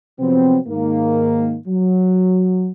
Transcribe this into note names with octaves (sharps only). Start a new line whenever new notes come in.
C3 F3 F#3 B3 C4
G#2 D#3 A#3
F#3